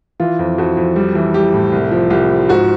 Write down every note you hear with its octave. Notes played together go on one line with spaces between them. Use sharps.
E3 F4
F2
F2 F#4
F2
G3
E3
G3 G4
A2
C2
F3
C2 G4
F3
G#2 F#4